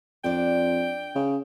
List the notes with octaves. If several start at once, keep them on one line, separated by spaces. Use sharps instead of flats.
F2 D4 D5 G5
C#3